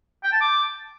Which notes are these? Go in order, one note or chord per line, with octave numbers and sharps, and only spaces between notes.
G5
A5
D6